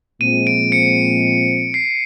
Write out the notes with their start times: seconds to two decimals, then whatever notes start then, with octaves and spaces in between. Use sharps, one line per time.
0.21 A#2 F3 G#3 C4 D#7
0.47 D7
0.72 C#7
1.74 C7